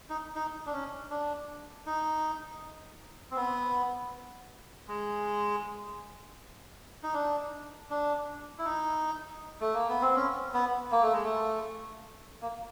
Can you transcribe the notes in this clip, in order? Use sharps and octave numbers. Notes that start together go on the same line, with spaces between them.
D#4
D#4
D4
C#4
D4
D#4
C4
B3
G#3
D#4
D4
D4
E4
D#4
A3
A#3
B3
C4
C#4
B3
A#3
A3
G#3
A3
A#3